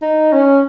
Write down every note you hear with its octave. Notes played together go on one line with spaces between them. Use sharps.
D#4
C#4